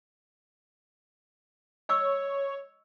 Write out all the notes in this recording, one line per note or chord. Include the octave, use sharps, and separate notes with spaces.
C#5 D#5 C#6 E6